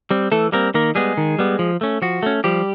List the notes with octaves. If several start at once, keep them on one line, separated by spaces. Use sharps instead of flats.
G3 C4
E3 A3 A4
G3 A#3 C4 A#4
D#3 A#3 A#4
G3 G#3 B3 G#4
D#3
G3 B3
F3
A3 C#4
F3 F#4
A3 C#4
F3 G3 G4